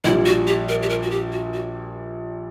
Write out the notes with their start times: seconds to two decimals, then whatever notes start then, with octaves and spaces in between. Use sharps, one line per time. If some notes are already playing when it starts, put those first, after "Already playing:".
0.04 A#1 E4
0.07 A#2 G3
0.26 F#4
0.47 G4
0.69 A#4
0.83 G4
0.89 A#4
1.03 F#4
1.11 G4
1.32 F#4
1.54 F#4